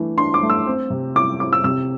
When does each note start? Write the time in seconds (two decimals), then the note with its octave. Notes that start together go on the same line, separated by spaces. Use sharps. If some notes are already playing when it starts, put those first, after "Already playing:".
Already playing: E3 A3 D4
0.17 D4 C6
0.34 D6
0.43 A3
0.50 E6
0.67 C4
0.90 C3
1.16 E4 D6
1.40 E4 D6
1.53 E6
1.64 C3 E6